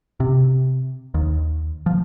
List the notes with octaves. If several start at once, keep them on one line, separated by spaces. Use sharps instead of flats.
C3
D#2
F3